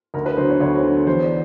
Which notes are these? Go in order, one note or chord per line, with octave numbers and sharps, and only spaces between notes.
D2 A#4
B4
D3 F#3 C5
C#5
D2 C#5
C5
D3 F#3
E2 C5
D5